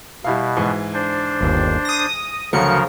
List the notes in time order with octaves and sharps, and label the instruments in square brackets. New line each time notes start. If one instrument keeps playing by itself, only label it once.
[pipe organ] B2 [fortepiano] G3 E4 F5
[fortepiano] G#2 E3
[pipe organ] D4 C5
[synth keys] G1 D#2
D#6 A#6
[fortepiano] D2 F#3 A3 [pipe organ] C#3 F3 A#4 [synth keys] C#7